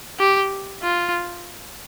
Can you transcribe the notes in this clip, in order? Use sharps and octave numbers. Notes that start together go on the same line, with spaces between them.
G4
F4